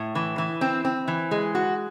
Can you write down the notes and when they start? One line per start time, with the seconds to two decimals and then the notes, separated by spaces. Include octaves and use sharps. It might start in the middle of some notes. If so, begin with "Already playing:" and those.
Already playing: A2
0.15 E3
0.38 E3
0.61 C4
0.85 C4
1.08 E3
1.31 G#3
1.55 F#4